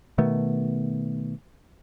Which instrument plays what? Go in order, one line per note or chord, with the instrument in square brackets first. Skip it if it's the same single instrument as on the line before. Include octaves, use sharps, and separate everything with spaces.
[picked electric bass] B2 D#3 A3 B3